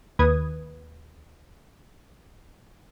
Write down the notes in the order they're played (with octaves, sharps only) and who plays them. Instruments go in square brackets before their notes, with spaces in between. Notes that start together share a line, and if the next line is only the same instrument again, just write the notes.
[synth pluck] D#2 B4 D#6 G#6